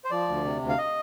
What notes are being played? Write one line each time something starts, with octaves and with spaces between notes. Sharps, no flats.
C5
F3 D5
D2
C3
D2
F5
D#5